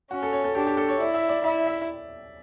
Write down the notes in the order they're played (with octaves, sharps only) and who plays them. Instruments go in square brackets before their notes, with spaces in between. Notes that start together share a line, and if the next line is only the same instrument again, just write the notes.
[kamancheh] C#4 [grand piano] F#4
[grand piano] A4
C#5
A4
[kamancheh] D4 [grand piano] G4
[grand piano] G4
A4
C#5
[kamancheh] E4 [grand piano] D5
[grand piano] E5
D5
[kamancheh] E4 [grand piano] E5
[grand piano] E5